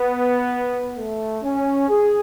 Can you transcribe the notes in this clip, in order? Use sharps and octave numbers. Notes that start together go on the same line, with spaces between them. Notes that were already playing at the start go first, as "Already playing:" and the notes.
Already playing: B3
A3
C#4
G#4